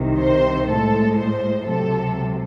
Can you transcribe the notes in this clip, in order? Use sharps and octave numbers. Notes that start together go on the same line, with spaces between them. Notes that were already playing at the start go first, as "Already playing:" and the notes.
Already playing: C2 C3 D#3
C5
A2 G#3 A4
C5
C#2 C3 F#3 A4